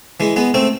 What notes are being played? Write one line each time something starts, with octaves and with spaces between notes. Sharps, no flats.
E3 G#3
G#3 B3
A3 C4